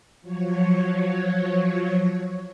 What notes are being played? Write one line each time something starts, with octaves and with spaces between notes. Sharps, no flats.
F3 F#3 C#5